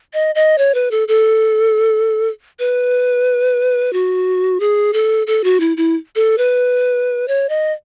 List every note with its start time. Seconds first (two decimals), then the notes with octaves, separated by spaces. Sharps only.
0.14 D#5
0.35 D#5
0.58 C#5
0.74 B4
0.91 A4
1.08 A4
2.59 B4
3.93 F#4
4.60 G#4
4.93 A4
5.27 A4
5.44 F#4
5.60 E4
5.77 E4
6.16 A4
6.38 B4
7.28 C#5
7.49 D#5